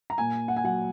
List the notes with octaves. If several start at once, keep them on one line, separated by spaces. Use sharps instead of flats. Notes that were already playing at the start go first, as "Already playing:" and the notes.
A#5
A#2 G#5
F#5
G#5
F#3 F#5